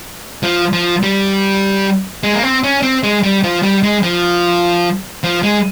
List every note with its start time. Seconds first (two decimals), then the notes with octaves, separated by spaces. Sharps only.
0.43 F3
0.73 F3
1.03 G3
2.23 G#3
2.34 A#3
2.43 C4
2.64 C#4
2.82 C4
3.03 G#3
3.24 G3
3.44 F3
3.63 G3
3.83 G#3
4.03 F3
5.24 F3
5.43 G#3